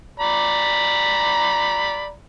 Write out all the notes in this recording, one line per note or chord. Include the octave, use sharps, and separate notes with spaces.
D5 A#5 B5